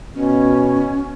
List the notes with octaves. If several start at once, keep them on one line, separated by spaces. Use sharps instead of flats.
B2 C#4